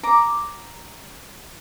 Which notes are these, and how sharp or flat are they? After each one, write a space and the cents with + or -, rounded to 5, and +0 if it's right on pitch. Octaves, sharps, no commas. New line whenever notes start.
A#5 +0 D6 +0